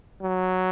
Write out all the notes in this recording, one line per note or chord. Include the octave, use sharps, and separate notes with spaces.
F#3